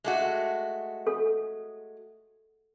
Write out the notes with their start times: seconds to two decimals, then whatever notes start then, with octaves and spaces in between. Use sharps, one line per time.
0.04 G#3 A3 F#4
1.07 A4